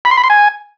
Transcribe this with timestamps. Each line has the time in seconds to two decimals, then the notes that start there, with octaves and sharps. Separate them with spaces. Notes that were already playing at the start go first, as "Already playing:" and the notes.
0.05 B5
0.11 C6
0.17 B5
0.24 C6
0.30 G#5